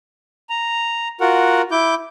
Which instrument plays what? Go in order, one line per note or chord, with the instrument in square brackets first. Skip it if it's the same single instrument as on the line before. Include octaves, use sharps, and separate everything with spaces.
[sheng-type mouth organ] A#5
F4 F#4 A#4 F#5
E4 D6 G6